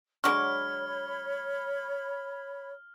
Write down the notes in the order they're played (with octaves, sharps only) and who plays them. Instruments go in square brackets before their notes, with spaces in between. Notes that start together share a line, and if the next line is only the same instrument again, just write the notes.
[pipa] D3 F#3 G#3 [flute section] C#5 B5 [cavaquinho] C#6 D6 [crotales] F6